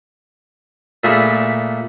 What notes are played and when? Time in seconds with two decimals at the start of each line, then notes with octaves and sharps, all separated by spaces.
1.04 A#2 A3 D4 G#4 A5 B5